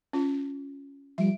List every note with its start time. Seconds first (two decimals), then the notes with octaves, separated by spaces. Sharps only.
0.13 C#4 F4
1.18 F3 G3 E5 D7